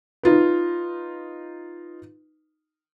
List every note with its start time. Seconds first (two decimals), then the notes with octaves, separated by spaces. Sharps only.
0.23 D#4 F4 B4